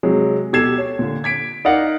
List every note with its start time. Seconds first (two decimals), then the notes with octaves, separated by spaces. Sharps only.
0.03 C3 F#3 G#3
0.53 B2 G4 A4 G#6 C7 E7
0.78 C#5
0.99 A#2 D3
1.24 G#6 B6 D7
1.65 D#4 A#4 D5 F5 F#5